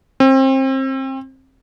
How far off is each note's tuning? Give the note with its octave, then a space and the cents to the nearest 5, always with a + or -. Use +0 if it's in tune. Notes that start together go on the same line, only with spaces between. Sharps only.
C4 +30